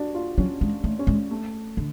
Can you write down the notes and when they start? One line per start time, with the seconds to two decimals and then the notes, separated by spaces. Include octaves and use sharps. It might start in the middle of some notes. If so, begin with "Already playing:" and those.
Already playing: D4 F#4
0.15 F4
0.38 F#3 C#4
0.61 G#3
0.84 A3
0.99 C#4
1.07 G#3
1.31 A3
1.77 D3